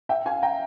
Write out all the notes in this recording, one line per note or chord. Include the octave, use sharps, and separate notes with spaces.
E5 G5
F5 G#5
G5 A#5